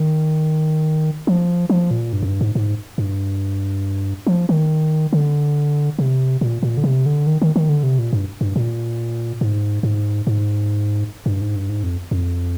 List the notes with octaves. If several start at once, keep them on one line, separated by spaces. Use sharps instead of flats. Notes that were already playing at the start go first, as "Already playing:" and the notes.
Already playing: D#3
F3
F3
A#2
G2
F2
G2
G#2
G#2
G2
F3
D#3
D3
C3
A#2
A#2
D3
C3
D3
D#3
D#3
D#3
D3
C3
A#2
G2
G2
A#2
G#2
G#2
G#2
G2
G#2
G2
G#2
F2
F2